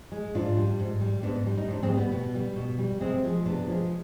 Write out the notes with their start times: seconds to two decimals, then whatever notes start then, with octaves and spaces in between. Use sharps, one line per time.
0.12 G#3
0.35 G#2 D4 F4
0.57 G3
0.80 G#2
1.01 G3
1.23 G#2 B3 D4
1.46 G3
1.58 D#4
1.68 G#2 D4
1.83 G#3 C4
1.89 G3
1.97 B3
2.12 B2 B3
2.35 G3
2.56 B2
2.78 G3
3.01 C3 G#3 C4
3.24 F3 G#3
3.46 C3 B3 D4
3.67 F3 G#3